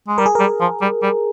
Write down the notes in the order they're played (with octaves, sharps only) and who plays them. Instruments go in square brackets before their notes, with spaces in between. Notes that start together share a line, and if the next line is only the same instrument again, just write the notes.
[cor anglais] G#3
[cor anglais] G3 [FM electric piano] A#4
[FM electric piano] G#4
[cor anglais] G3 [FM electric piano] A#4
[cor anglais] F3
G3
G3